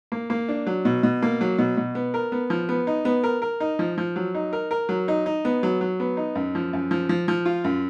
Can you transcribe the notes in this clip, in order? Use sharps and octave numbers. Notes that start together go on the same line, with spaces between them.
A#3
A#3
D4
F#3
B2
B2
A#3
F#3
B2
B2
B3
A#4
B3
F3
B3
D#4
B3
A#4
A#4
D#4
F3
F3
F#3
D#4
A#4
A#4
F#3
D#4
D#4
B3
F#3
F#3
B3
D#4
F#2
F3
F#2
F3
F3
F3
F4
F#2